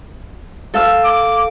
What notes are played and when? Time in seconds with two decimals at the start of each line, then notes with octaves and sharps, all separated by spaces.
0.74 A4 F5 E6
1.05 D6